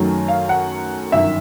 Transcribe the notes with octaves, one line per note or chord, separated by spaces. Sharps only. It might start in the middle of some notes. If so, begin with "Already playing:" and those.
Already playing: F#2 D#3 F#3 A3
F5
F#5
G1 F#2 D#3 E5